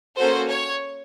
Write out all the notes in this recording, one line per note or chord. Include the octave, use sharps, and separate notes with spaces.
A#3 C#4 F#4 A4 C5
C#5